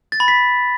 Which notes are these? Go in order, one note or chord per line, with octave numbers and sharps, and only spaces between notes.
A6
B5
B6